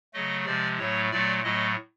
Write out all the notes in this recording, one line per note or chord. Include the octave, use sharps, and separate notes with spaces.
C#3 F#3 A3 D#5
C3 F3 G#3 D5
A2 F#3 A3 C#5
A#2 F#3 A3 D5
A2 F#3 A3 D#5